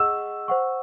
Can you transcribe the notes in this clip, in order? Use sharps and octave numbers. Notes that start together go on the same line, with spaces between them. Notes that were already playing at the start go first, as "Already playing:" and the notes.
Already playing: G#4 D#5 F#5 C#6 E6
C5 F#5 C#6